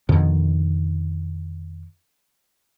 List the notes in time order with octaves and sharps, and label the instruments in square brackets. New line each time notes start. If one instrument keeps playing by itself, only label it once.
[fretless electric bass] F2 B2 D3 D#3